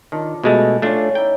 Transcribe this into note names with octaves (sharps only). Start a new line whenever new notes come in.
D#3 D4 F4
B2 G#3 A3 E5
A3 C#4 D4 F4 D5
D#4 E4 G5